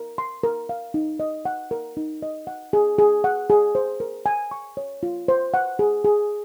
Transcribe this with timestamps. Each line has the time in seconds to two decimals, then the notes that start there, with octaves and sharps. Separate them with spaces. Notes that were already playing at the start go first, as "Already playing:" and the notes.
Already playing: A#4
0.18 C6
0.43 A#4
0.69 F5
0.94 D#4
1.20 D#5
1.45 F#5
1.71 A#4
1.97 D#4
2.22 D#5
2.47 F#5
2.73 G#4
2.98 G#4
3.24 F#5
3.50 G#4
3.75 C5
4.00 A#4
4.26 G#5
4.51 C#6
4.77 C#5
5.03 F4
5.28 C5
5.54 F#5
5.79 G#4
6.04 G#4